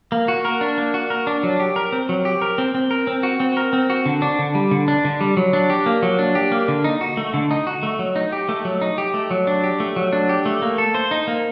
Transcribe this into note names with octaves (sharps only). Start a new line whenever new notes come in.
A#3
F#4
A#4
D4
A#3
F#4
A#4
D4
F#3
G4
A#4
C4
F#3
G4
A#4
C4
C4
A#4
C4
F#4
C4
A#4
C4
F#4
D3
D4
D3
G3
D3
D4
D3
G3
F#3
D4
G4
A#3
F#3
D4
G4
A#3
D3
D#4
F#4
A3
D3
D#4
F#4
A3
F#3
D#4
G4
A3
F#3
D#4
G4
A3
F#3
D4
G4
A3
F#3
D4
G4
A3
A#3
A4
C5
D#4
A#3